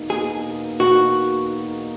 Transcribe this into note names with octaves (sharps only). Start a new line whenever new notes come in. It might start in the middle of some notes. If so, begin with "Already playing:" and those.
Already playing: E2 B2 A#3 D#4
G#4
F#4